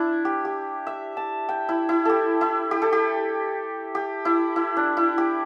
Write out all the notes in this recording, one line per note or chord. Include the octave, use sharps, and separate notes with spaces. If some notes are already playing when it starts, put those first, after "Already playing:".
Already playing: D4 E4
G4
G4
E5
A5
G5
E4
E4
G4 A4
E4
G4
A4
G4
G4
E4
E4
D4
E4
G4